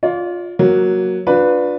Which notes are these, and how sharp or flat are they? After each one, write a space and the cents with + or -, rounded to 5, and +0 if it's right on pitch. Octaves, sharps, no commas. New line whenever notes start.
F4 +15 D5 -40
F#3 +0 A#3 +5
D4 +0 F4 +35 B4 +0